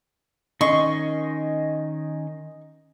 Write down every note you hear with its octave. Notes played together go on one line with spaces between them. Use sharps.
D#3 C#4 D#5 C6 C#6